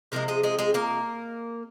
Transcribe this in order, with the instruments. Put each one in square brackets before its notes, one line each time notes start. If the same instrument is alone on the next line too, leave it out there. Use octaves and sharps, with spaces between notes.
[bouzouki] C3 F3 G#3 A#3 A#4
G#3 G#4
G#3 G#4
G#3 G#4
A#3 A#4